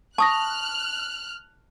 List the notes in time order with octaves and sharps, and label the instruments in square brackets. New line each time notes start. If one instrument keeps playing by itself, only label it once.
[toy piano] A5 [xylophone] C#6 D#6 A#6 [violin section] F6 F#6